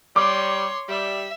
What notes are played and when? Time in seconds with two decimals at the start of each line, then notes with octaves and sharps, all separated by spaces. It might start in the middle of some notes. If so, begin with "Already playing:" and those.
0.16 G3 C#5 C6 D6
0.89 G3 E5